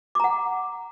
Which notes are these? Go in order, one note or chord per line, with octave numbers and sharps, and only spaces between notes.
F#5 A#5 D6